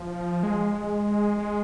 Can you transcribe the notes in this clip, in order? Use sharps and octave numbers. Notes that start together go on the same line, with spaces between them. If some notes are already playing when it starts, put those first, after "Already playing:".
Already playing: F3
G#3
G#3